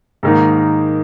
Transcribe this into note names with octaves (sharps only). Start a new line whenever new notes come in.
G#2 D#3 A#3 D#4